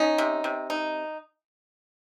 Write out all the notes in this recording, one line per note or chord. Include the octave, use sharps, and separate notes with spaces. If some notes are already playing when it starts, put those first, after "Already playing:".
Already playing: C#4 D#4
C3
C3
D#4